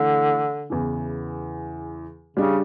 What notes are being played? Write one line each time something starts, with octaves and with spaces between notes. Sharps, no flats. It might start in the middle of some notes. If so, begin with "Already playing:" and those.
Already playing: D3 E3 A3
E2 C#3 E3
C#3 G3 D4 G4